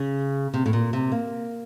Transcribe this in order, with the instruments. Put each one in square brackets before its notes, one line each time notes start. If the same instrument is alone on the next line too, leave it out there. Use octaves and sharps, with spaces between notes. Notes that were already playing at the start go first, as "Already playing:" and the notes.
Already playing: [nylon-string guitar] C#3
C3
A2
A#2
C3
A#3